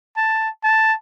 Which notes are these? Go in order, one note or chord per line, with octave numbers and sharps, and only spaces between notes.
A5
A5